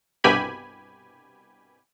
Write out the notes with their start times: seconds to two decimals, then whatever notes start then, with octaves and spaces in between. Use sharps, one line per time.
0.24 C2 G2 B2 G4 G#5 B5